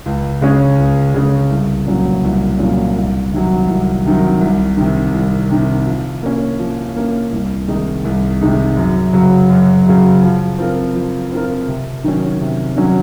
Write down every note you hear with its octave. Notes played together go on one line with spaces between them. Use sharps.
C#2
C#3 G#3 C#4
C#2
C#3 G#3 C#4
C2
A#2 F#3 C#4
C2
A#2 F#3 C#4
C2
C3 D#3 F#3
C2
C3 D#3 F#3
C2
C3 D#3
C2
C3 D#3
F3
A#3 C#4
F3
A#3 C#4
C2
C3 D#3 G#3 D#4
C2
C3 D#3 G#3 D#4
F#2
C#3 F#3
F#2
C#3 F#3
F3
C4 F4 A#4
F3
C4 F4 A#4
C3
D#3 F#3 C#4
C3
D#3 F#3 C#4